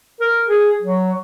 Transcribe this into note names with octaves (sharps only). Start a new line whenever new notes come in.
A#4
G#4
F#3